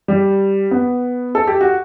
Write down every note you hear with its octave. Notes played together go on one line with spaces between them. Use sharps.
G3
B3
A4
G4
F#4